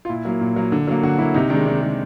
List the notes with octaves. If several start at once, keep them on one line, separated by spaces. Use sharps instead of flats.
F4
A#2 E4
F#3 A#3
A#2
F#3 A#3
D3
F#3 A#3
D3 F#4
F#3 A#3 E4
C3 D#4
D#3 G#3 D4
C3 D4
D#3 G#3